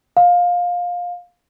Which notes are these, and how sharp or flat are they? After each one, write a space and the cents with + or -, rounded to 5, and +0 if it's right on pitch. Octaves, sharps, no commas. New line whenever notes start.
F5 +20